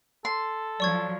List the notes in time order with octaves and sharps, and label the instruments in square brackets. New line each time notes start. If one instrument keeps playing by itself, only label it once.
[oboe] A4 [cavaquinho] C6
[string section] F3 F#3 [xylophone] D5 C#6 G#6